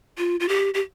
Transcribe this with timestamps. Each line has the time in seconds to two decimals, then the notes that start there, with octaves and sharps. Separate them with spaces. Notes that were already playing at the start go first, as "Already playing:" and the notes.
0.18 F4
0.40 F4
0.49 G4
0.74 G4